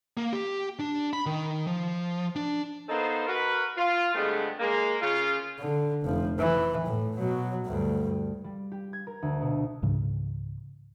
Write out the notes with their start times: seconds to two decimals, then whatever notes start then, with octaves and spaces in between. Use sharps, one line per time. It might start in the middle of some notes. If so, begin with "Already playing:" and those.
0.17 A#3
0.33 G4
0.79 D4
1.13 B5
1.26 D#3
1.67 F3
2.36 D4
2.89 A#3 B3 D#4 A4 C5
3.27 F#4 A#4 B4
3.76 F4
4.15 G2 D3 G#3 A3 B3 C4
4.59 G#3 A#3
5.02 C#3 F4
5.59 D3
6.04 F1 F3
6.39 E3
6.86 A2
7.18 B2 F#3
7.65 D2 G2
8.44 G3
8.72 G4
8.93 G#6
9.07 A#4
9.22 D2
9.42 B2
9.82 C#2 G#2 C#3 E3